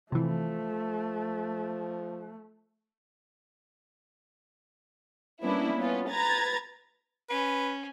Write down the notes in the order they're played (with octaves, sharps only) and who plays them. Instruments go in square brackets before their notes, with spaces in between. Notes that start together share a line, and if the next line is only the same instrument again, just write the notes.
[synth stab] C3 E3 [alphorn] F3 [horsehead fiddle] A3
[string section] G3 A#3 B3 C#4 D4 E4
B3 C#4 F4
B4 A#5 G#6 A6
[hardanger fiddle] C#4 [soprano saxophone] B4